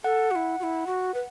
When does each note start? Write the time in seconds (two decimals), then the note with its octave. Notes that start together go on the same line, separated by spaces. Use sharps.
0.04 A4 F#5
0.31 F#4
0.36 E4
0.60 F#4
0.63 E4
0.87 F#4
1.14 B4